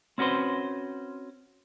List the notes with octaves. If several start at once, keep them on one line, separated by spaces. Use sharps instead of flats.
C4 C#4 F#4 B4 C5